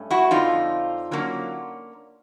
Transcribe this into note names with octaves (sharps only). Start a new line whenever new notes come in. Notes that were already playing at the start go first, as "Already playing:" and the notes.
Already playing: G2 A3 C#4
E4 F#4
F2 D3 F3 D#4 F4
D3 F#3 A#3 C#4